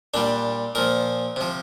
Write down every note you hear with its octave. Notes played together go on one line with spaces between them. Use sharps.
A#2 G3 D4
A#2 F3 A#4
C3 F3